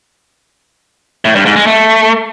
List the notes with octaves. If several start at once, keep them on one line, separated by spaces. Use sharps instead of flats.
A2
G2
G#2
G#3
A3